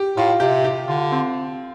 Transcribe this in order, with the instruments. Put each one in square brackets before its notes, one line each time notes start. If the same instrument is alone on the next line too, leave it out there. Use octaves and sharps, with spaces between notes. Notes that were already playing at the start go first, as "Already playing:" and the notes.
Already playing: [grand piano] G4
[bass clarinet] A2 [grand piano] F4
[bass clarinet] C3 [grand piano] G4
[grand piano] G4
[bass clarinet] D3 [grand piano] F4
[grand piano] C4